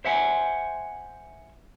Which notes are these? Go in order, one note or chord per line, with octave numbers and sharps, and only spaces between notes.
C5 E5 F#5 G#5